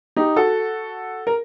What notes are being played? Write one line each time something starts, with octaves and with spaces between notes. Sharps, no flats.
D#4 G4
F#4 A4
A#4